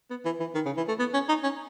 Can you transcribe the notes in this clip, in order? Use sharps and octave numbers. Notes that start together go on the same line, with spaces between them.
B3
E3
E3
D#3
C#3
E3
A3
B3
C#4
D#4
C#4